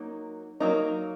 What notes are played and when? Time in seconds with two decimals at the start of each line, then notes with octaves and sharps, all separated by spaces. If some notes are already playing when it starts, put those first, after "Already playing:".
Already playing: F#3 A#3 D#4
0.60 F#3 A#3 D#4